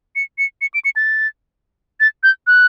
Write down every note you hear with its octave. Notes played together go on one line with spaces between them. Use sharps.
C#7
C#7
C#7
D7
C#7
A6
A6
G6
F#6